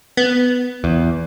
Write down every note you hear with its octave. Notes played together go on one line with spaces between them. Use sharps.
B3
E2